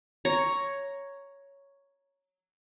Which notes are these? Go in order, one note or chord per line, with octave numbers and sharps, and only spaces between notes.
C#5 A#5